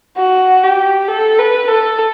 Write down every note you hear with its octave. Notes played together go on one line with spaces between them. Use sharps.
F#4
G4
A4
B4
A4